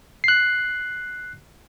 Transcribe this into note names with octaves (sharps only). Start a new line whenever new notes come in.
F#6 C7